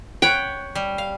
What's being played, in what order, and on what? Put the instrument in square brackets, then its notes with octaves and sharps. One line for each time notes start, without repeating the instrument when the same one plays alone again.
[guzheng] C#5 F#5 B5 [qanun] G5
[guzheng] G3
F5